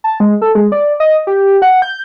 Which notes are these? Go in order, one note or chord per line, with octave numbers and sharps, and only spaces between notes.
A5
G#3
A4
G#3
D5
D#5
G4
F#5
G6